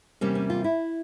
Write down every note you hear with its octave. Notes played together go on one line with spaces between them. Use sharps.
E2 C3 G3 A#3 C#4
C#4
F4
E4